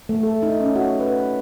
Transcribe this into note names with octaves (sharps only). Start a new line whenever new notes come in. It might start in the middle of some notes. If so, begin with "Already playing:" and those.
A3
A4
D#4
C#4
F#4
B4